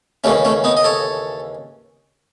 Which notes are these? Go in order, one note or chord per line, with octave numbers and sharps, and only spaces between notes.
D#2 C#3 E3 A3 C#4
A3 C#4
B3 D#4
D#5
A4 C#5